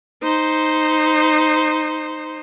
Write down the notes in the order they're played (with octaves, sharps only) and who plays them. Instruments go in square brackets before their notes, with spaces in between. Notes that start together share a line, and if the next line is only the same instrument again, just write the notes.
[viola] D#4 C5